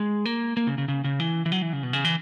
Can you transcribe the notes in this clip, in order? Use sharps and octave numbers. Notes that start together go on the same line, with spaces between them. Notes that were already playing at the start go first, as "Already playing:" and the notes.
Already playing: G#3
A#3
A#3
C#3
C#3
C#3
C#3
E3
E3
F#3
E3
C#3
B2
C#3
E3